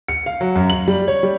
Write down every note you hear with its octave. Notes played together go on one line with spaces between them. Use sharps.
C#7
F5
F#3
F#2
F#7
G3
C#5
G3